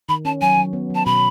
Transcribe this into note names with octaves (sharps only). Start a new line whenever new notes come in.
D#3 B5
C#4 A5
F#3 G#5
F#3
B3
F#3
A5
B2 B5